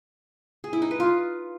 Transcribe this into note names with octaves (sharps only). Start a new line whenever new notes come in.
G#4
E4
D#4
B4
F4